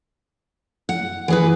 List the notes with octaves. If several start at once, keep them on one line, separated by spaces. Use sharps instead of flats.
F#5
E3 G#4 B4